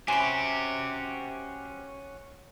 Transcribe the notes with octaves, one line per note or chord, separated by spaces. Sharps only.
C#4 F#4 G4 C5 G#5 B5